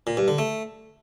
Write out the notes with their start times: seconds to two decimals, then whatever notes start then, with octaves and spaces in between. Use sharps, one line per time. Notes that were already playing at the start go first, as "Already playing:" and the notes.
0.07 A#2
0.17 G2
0.28 D3
0.38 A3